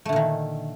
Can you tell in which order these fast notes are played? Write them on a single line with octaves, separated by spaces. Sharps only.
A3 D3 A#2 D#3